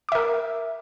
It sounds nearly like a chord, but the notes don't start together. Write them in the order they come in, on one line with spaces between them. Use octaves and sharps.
D6 E5 A#4